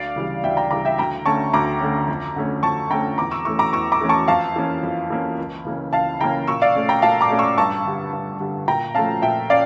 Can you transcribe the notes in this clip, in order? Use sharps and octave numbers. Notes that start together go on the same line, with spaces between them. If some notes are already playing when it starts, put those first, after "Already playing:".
Already playing: D2 D5 F5
C#3 E3 G3
D2 E5 G5
G5 A#5
C#3 E3 G3 A#5 D6
E5 G5
D2 G5 A#5
D3 A3 C#4 A5 C#6
D2 A#5 D6
D3 A3 C#4
F2
D3 A3 C#4
F2 A5 C#6
D3 A3 C#4 G5 A#5
E2 A#5 D6
C#6 E6
E3 A3 C#4 C#6 E6
A#5 D6
E2 C#6 E6
A#5 D6
E3 A3 C#4
A5 C#6
F2 F5 A5
E3 A#3 C#4
F2
E3 A#3 C#4
C#2
C#3 E3 A#3 C#4
C#2 F5 A5
C#3 E3 A#3 C#4 G5 A#5
A#2 C#6 E6
D5 F5
A3 C#4
G5 A#5
A#2 F5 A5
A#5 D6
A3 C#4
C#6 E6
G2 A5 C#6
D3 G3
G2
D3 G3
A#2 G5 A#5
F3 A3 C#4 F5 A5
A#2 E5 G5
C#4 D5 F5